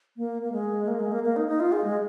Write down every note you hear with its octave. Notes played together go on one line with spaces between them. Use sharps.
A#3
A#3
G#3
A#3
G#3
A#3
A#3
D#4
D#4
F4
G#4
G#3